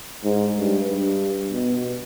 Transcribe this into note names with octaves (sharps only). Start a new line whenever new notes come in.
G#2
G2
G2
B2